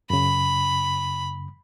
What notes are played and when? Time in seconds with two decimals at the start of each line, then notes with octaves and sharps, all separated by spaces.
0.10 F#2 C#3 B5